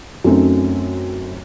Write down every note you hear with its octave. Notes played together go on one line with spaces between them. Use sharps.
F#2 F#3 A3 C4 C#4 D#4